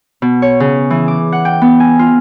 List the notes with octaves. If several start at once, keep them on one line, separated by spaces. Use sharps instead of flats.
B2
C#5
C#3
E3
D6
F#5
G5
B3
G#5
F4